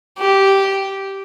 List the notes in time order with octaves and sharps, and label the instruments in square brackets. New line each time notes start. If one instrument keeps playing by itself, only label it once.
[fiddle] G4